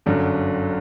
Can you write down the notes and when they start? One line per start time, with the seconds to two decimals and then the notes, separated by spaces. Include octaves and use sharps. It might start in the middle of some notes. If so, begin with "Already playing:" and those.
0.06 G1 F#2 D3 F#3